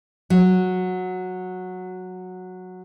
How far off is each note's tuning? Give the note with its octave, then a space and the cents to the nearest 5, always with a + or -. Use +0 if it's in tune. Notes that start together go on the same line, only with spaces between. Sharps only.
F#3 -10